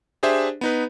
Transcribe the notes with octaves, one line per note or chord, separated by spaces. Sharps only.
D4 G4 G#4 C5 E5
B3 D#4 B4